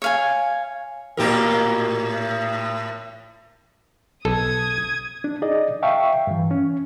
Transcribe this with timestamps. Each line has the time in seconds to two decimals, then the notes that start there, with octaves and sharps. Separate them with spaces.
0.02 C#5 F5 G#5
1.17 A2 G4 A#4
4.25 B1 A4 D#6 G#6
5.24 D4
5.42 D#4 G#4 D5 D#5
5.83 E5 F5 G5 A5 C#6
6.27 G2 E3
6.51 C#4